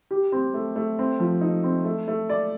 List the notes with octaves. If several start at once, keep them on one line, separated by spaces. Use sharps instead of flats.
G4
C4
A3
A3
C4
F3
D#4
C4
A3
A3
D5